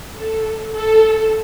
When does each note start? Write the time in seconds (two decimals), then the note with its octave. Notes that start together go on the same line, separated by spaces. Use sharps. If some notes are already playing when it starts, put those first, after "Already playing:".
0.18 A4
0.74 A4